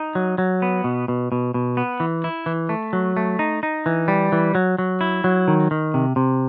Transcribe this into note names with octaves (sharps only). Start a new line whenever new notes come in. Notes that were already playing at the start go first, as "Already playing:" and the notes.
Already playing: D#4
F#3
F#3
B3
B2
B2
B2
B2
B3
E3
E4
E3
A3
F#3
A3
D#4
D#4
E3
G3
E3
F#3
F#3
E4
F#3
D#3
D#3
C3
C3